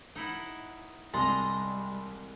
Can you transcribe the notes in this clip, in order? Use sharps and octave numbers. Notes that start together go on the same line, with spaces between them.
D#4 E4 F#5
C2 G3 G#3 D#5 A5 A#5 C6